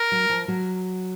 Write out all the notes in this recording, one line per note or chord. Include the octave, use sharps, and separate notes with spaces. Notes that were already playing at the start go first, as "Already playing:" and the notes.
Already playing: A#4
F#3
F3
F#3